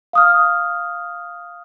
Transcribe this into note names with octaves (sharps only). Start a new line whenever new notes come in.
F5 D#6 F6